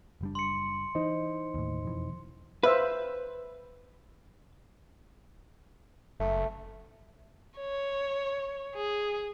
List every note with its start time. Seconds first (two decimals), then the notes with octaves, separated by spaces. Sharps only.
0.21 F#1 G3 D4
0.35 C6 C#7
0.95 E3 D#4 C5 D#5
1.54 D#2 A2
1.83 E1 F2 E3
2.63 B4 C5 E5 F5
6.20 F#1 A3
7.58 C#5
8.74 G#4